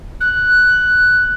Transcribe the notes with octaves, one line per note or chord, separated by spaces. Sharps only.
F#6